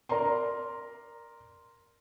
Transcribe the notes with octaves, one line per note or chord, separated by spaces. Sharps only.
A#4 D5 A#5 C6